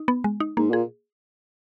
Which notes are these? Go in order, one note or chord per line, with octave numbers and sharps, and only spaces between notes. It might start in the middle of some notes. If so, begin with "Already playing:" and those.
Already playing: D#4
B3
G#3
D#4
G#2 A#3
A#2 G#4